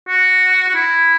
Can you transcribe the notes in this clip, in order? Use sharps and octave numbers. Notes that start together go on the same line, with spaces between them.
F#4
F#4
E4